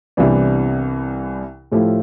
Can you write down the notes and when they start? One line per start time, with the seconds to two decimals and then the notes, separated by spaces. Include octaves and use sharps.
0.17 C2 C3 E3 B3 D4
1.72 A2 F3 A3 E4 G4